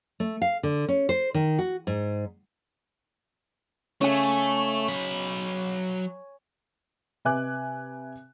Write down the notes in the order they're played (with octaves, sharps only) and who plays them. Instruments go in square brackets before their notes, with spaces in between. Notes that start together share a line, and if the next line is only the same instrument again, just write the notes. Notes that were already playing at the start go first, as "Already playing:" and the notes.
[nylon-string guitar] A3
F5
D3
C#4
C5
D#3
F#4
G#2
[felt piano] C#3 [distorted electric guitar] A3 [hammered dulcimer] C#5 G#5
[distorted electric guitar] F#3 B5
[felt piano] C3 B4 E5 G#5 D6 F#6